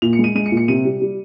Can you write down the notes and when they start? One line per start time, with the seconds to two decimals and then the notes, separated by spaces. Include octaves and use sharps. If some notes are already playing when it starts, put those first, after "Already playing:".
0.02 A#2 F7
0.13 C#7
0.19 G#3
0.24 D#7
0.35 G#3 D#7
0.46 C#7
0.52 A#2
0.57 C#7
0.68 C3 D#7
0.85 G3
1.02 G3